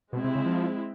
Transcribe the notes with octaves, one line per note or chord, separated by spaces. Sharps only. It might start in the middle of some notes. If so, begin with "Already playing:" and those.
B2 G#3 C4 E4
C3
C#3
F3